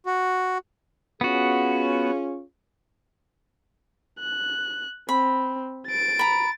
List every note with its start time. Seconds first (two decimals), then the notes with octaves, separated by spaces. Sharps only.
0.06 F#4
1.21 B3 C#4 F4 F#4 G#4
4.20 F#6
5.09 C4 B5
5.87 A6 D7
6.19 A#5 B5